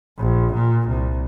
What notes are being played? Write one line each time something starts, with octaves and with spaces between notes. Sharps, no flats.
A#1
A#2
C2